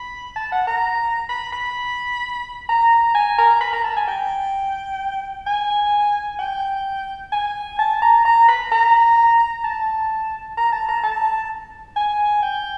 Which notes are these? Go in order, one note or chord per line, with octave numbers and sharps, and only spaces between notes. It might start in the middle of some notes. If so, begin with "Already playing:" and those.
Already playing: B5
A5
F#5
A#5
B5
B5
A#5
G#5
A#5
B5
A#5
A5
G#5
G5
G#5
G5
G#5
A5
A#5
A#5
B5
A#5
A5
A#5
A5
A#5
A5
G#5
G5